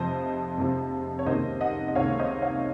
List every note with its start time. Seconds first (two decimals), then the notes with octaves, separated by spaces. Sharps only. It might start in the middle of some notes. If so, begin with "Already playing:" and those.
Already playing: F1 F2 C3 F3 C5 D#5
0.57 F1 F2 C3 F3
1.19 C#5
1.26 C#2 C3 D#3 A#3 C5 D#5
1.61 D#5 F#5
1.88 D#5
1.95 C#2 C3 D#3 A#3 C#5 F5
2.19 C5 D#5
2.42 C#5 F5